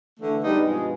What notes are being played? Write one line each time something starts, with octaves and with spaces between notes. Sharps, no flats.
D3 E3 A3
G3 G#3 B3 D4 D#4
G2 B2 F3 G#3